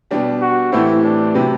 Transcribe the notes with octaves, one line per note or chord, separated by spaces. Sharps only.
B2 G3 D4 G4
F#4
A2 E3 A3 C4 E4 G4
D4
C3 F#3 C4 G4 B4